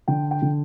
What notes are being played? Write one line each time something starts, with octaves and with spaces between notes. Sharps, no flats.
D3 G5
G5
D3